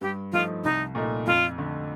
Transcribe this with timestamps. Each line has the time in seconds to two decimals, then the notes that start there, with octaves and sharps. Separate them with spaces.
0.01 G2 G4
0.32 F3 A3 D#4 F4
0.64 C2 D#4
0.95 A#2 A3 D#4
1.26 F2 F4
1.58 D3 A3